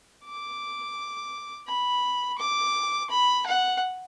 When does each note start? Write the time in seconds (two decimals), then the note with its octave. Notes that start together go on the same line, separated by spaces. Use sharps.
0.25 D6
1.67 B5
2.38 D6
3.10 B5
3.46 F#5